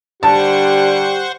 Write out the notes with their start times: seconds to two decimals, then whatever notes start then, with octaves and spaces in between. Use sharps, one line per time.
0.23 D3 G3 G4 C5 F#5 A5 C#6